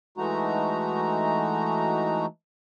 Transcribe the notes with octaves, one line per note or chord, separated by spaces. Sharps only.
E3 G#3 A3 D#4 F#4 A#5